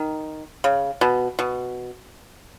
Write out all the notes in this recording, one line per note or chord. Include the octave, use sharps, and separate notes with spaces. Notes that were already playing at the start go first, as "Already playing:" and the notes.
Already playing: D#3
C#3
B2
B2